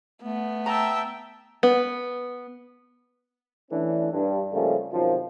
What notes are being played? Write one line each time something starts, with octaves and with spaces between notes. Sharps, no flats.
A3 B3
E5 G5 A5 A#5
B3
E3 A3 C#4 D4
G2
C#3 F3 G3 A3 A#3 C#4
F#2 C3 D#3 F3